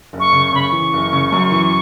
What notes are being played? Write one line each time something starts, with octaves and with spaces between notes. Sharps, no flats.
F#1
C#6
C#3
C#6
C#3 B5
C#6
E3
F#1
C#3
F#2
E3